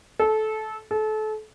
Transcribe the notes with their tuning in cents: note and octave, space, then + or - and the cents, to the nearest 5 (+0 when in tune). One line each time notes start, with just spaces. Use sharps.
A4 -20
A4 -30